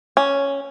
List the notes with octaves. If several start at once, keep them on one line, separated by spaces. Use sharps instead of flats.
C#4